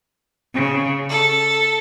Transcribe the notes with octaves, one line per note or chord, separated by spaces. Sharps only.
C#3
A4